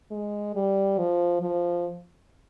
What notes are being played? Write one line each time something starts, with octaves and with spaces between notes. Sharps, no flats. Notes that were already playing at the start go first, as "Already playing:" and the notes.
G#3
G3
F3
F3